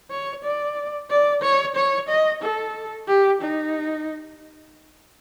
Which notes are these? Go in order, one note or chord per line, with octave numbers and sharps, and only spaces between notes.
C#5
D5
D5
C#5
C#5
D#5
A4
G4
D#4